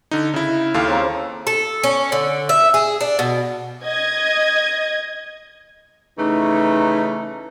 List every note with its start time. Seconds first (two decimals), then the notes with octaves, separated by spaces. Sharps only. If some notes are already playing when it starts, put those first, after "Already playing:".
0.11 D3 D#4
0.34 C#3 E4
0.74 D#2 F4 G4 A4 F5
0.87 C#3 C4 A#5
1.47 A4
1.83 C#4
2.12 D3
2.49 E5
2.74 G#4
3.01 D4
3.19 B2
3.84 D#5 G#6
6.19 C#3 E3 A3 D#4